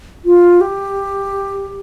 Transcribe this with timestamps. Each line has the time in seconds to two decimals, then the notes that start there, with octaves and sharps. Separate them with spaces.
0.25 F4
0.61 G4